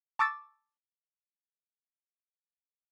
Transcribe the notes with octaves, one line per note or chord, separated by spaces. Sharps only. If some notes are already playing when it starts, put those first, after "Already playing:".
A5 C#6 D6 E6 A6